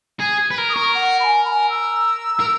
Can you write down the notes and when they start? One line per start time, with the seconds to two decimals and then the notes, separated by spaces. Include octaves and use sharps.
0.20 G#4 G#6
0.51 B4
0.58 A#4
0.69 D#6
0.74 A#4 C#6
0.95 F#5
1.20 B5
1.24 G#5
1.45 B5
1.49 G#5
1.70 E6
2.40 A#4